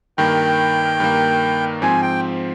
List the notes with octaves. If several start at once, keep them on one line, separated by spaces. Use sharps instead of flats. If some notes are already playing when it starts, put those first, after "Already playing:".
G2 D#3 A#3 G5
G2 D#3 A#3
G#2 F3 C4 G#5
G5